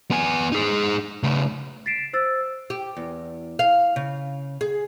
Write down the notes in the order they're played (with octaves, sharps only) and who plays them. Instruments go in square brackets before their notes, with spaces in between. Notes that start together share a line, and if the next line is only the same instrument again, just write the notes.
[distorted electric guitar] B3 G#5
D#4 G#4
C#3 A3
[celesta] A6 B6 C7 D7 E7
C5 E6 A6
[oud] G4
E2
F5
C#3
G#4